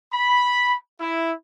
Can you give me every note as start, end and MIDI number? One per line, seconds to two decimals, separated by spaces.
0.12 0.75 83
1.00 1.31 64